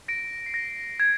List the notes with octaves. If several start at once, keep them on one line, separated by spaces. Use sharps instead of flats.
A#6 D7
C7
A#6
G#6